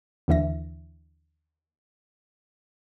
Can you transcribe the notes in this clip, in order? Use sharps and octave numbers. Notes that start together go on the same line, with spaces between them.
D#2 D3 E3 E5 A#6